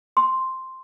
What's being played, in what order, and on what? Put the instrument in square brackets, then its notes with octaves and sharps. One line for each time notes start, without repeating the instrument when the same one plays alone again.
[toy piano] C6